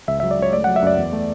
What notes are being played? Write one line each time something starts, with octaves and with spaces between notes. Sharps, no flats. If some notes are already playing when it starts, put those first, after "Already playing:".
C#2 E5
E5
F#3
D5
C#2 C#5
A3 D5
F#5
F#3
E5
F#2 D5
E2
A3